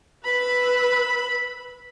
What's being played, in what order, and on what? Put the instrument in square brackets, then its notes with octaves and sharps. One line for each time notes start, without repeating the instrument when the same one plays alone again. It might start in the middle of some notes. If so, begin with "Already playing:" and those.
[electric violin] B4 E6 [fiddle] B5